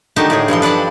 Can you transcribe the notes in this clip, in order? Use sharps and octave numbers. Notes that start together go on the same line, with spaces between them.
D3 D#3 D#4 F#4 G4 A5
A2 G4 G#4
G2 E3 F3 C6
D4 B4 D5 A5 B5